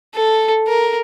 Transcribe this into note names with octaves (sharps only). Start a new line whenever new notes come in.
A4
A#4